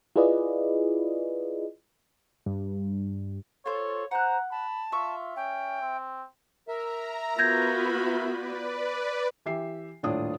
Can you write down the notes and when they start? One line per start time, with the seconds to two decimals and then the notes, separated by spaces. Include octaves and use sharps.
0.16 E4 F4 G#4 B4 D5 D#5
2.46 G2
3.66 F4 A4 C5 C#5
4.11 C5 F#5 A#5 F#6
4.51 A5 B5
4.92 F4 E5 C#6
5.36 C#4 G5
5.81 C4
6.68 A#4 E5 A#5
7.39 B3 F4 F#4 B5 G6 G#6 A#6
8.27 B4 D5
9.46 E3 G4 E5 C7
10.03 D#1 A2 D4 F4 C#5 D#6